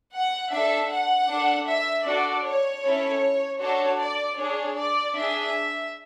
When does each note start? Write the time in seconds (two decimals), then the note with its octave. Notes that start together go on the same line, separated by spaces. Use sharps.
0.12 F#5
0.51 D4 A4 E5
0.91 F#5
1.28 D4 A4
1.68 E5
2.06 D4 F#4 A4 D5
2.45 C#5
2.84 C#4 E4 A4
3.61 D4 F#4 A4 C#5
3.99 D5
4.38 D4 G#4 C#5
4.77 D5
5.15 D4 G#4 E5